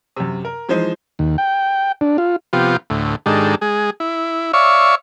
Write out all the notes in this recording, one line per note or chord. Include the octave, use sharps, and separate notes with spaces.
F#2 C3
A#4
E3 F3 G#3 D#4 C5
D#2
G5
D4
F4
C3 F3 B3 F4 G4
D2 A2
G#2 D#3 G#3 D4 G4 A4
G#3 G#4
E4
C#5 D5 E5 F5 C#6